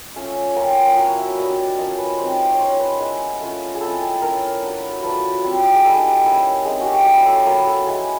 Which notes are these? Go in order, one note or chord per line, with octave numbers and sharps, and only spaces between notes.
A3 C#4 F4
A#3 C#4 F4 G5
F#5
F#5
F#3 B3 E4 F5
E5
G3 A#3 D4 D#5
D5
F3 A#3 C#4 D#5
B4
G3 C4 D#4 C5
C#5
A#3 C#4 F4 C5
B4
G#3 B3 E4
A3 C#4 F4
G#4
G#3 C4 E4 A4
A4
A3 C#4 E4 A#4
F#3 B3 D4
F#3 A3 D4 F4 B4
G3 C4 E4
G#4
G3 B3 D#4 A4
A#3 C#4 E4
G#3 C4 D#4 G#4
F#4 G4
A3 C#4 E4 G4
A4
F#3 B3 E4 A#4
A4
G#3 B3 E4 G#4